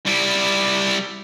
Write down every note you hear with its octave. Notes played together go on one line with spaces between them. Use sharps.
G3 E4